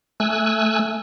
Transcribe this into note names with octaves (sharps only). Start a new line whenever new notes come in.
A3 G#5 E6 F#6